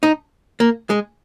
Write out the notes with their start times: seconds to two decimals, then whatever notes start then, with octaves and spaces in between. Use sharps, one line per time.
0.03 D#4
0.60 A#3
0.90 G#3